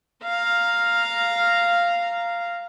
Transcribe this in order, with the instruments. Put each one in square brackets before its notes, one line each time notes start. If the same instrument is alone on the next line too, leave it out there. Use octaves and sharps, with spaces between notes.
[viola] F5 A#5